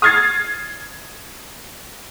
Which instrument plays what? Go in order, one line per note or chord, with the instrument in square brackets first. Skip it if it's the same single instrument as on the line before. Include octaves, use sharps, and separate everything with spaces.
[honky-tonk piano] D#6 F6 G#6 A6 C7